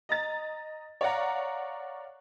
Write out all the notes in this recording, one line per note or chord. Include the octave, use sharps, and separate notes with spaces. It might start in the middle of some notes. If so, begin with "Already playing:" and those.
D#5 A#5 A6
C#5 D5 F5 F#5 A#5